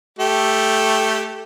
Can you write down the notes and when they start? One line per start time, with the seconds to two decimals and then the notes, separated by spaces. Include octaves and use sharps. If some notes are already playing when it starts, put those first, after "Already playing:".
0.19 A3 G4